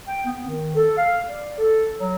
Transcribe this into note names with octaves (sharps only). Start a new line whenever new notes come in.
G5
B3
D#3
A4
F5
D5
A4
F#3